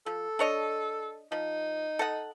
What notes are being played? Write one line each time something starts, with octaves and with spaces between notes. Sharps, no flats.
F3 A4
D4 C#5 D#5
F3 D#4
A4 D#5 F#5